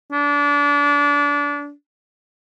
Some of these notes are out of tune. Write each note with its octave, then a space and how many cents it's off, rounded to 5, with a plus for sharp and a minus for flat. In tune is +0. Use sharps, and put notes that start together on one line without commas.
D4 -30